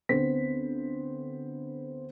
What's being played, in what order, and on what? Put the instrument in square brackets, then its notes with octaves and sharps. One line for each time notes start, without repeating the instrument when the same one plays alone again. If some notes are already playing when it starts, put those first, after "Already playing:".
[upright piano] D2 B3 C4 C5 B6